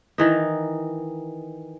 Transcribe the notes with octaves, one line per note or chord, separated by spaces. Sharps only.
D#3 E3 D#4